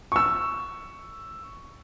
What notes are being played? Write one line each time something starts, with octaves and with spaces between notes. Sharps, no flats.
C#6 E6